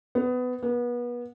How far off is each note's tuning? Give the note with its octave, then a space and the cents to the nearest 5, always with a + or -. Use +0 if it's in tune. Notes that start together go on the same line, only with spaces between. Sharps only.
B3 +20
B3 -30